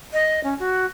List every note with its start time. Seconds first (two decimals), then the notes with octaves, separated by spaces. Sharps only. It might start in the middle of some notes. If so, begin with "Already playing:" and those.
0.13 D#5
0.44 C#4
0.59 F#4